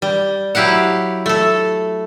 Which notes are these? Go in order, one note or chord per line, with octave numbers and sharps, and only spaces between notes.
G3
F#3 E4 G4 F5 F#5
A3 A4